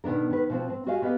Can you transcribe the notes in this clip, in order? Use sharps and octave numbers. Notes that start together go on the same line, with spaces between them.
B2 D#3 B3 D4 A#4
D#3 B4
B2 F3 C4
C4
F#4 G4 A#4 D#5 F5 G#5
A#3 B3 G4 B4 D#5